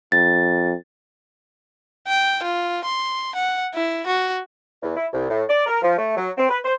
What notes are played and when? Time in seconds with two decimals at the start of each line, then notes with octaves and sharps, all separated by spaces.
0.12 F2 A6
2.07 G5
2.43 F4
2.85 C6
3.35 F#5
3.74 E4
4.06 F#4
4.82 E2
4.96 E4
5.12 C2
5.29 A2
5.49 D5
5.66 A#4
5.82 F3
5.97 A3
6.16 F#3
6.37 C4
6.49 B4
6.64 C5